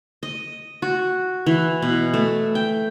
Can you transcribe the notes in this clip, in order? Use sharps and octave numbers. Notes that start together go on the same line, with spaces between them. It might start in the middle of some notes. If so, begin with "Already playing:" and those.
D#5
F#4
E3
B2
A3
G5